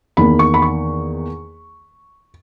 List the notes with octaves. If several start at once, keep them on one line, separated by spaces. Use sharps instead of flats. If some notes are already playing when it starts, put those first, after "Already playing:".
E2 D#3 A#3 B5
C#6
B5
C#6